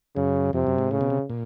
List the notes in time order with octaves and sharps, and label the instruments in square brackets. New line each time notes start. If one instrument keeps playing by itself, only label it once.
[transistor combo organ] F#2 [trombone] C#3
[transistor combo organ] F2 [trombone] C3
[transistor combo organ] F#2
G#2
[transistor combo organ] A2 [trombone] C#3
[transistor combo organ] B2
C3
A#2